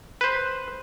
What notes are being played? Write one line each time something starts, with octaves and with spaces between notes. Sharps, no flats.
B4 C5